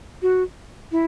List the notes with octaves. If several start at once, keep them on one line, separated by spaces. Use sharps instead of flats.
F#4
E4